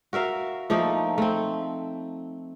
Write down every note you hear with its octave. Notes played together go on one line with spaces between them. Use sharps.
F#4 A#4 E5 F5
F3 A3 A#3 D#4
A3 C4